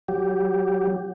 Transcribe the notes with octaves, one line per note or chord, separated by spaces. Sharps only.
F#3 G4